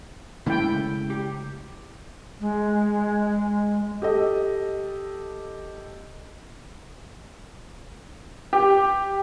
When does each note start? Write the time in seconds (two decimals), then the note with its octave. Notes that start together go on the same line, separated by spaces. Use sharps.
0.46 C#3 G#3 A3 E4 G5
1.10 G4
2.40 G#3
4.02 G4 A4 D#5
8.53 G4